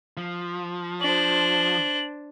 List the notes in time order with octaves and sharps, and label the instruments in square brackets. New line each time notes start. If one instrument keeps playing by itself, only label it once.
[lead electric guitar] F3
[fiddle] D4 C5 [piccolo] F#7